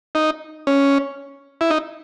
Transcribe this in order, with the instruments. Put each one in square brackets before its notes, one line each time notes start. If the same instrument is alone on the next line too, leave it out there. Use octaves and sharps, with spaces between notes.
[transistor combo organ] D#4
C#4
E4
D#4